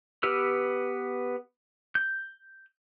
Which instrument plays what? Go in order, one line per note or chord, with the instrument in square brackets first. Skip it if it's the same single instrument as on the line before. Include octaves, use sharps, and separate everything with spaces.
[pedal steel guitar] B3 G4 B4 E6 F6
G6